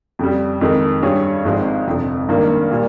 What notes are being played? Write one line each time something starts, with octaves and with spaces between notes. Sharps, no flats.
F2 C#3 G3
F2 D#3 G#3
G2 G3 C#4 G#4 C#5
G#1 G#2 F3 G#3 C4
G1 F2 C3 F3
G#1 G2 D#3 A#3
A#2 G3 A#3